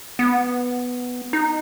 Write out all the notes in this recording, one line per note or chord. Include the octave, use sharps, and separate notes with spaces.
B3
D#4